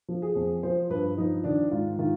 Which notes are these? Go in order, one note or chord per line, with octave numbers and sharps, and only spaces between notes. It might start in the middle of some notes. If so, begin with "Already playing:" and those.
F3
G#4
F2
F3 C5
G2 B4
F3 D#4
D#3 D4
G#2 F4
D#3 F4